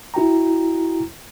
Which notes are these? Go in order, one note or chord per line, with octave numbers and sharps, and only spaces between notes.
E4 F#4 G5 A#5